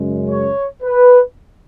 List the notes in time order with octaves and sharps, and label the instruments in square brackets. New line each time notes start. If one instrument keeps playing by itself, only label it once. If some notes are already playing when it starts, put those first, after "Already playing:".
Already playing: [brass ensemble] F#2 C#3 G#3
C#5
B4